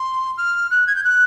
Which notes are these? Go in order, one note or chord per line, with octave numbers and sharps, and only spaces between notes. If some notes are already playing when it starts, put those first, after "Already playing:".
Already playing: C6
F6
F#6
G#6
G6
F#6